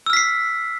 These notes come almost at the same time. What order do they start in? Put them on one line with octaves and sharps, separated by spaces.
E6 F6 B6 C7